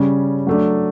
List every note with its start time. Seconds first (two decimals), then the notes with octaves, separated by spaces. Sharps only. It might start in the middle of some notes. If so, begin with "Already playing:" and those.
Already playing: C#3 G3 C#4
0.47 F#3 A3 D4